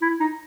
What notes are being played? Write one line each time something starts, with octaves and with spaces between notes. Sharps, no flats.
E4
D#4